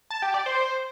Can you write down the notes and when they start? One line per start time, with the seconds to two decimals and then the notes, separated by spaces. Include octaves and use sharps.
0.10 A5
0.22 G4
0.34 D5
0.46 C5